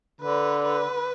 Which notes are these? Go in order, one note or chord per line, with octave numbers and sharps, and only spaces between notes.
D3 B4
B4